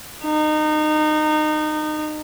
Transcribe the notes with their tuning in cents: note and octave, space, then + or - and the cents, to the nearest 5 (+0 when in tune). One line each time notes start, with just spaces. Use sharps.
D#4 -25